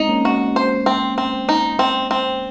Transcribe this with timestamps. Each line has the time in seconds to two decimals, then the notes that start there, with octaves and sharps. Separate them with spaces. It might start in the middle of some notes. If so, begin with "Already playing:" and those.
Already playing: G#3 C4 D#4
0.09 A#3 C#4
0.25 F#4
0.56 C5
0.86 C4
1.18 C4
1.49 D#4
1.79 C4
2.11 C4